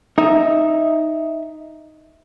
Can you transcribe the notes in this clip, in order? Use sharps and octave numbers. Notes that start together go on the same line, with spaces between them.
D#4 E5